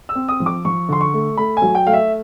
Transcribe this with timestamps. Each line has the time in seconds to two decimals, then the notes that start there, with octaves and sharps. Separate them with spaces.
0.09 E6
0.15 C4
0.29 D#6
0.40 F3
0.46 D6
0.65 F3 C#6
0.89 D3 C6
1.01 C#6
1.14 A3
1.37 A3 B5
1.57 G#5
1.62 F#3
1.75 G5
1.87 A3 F5
1.93 E5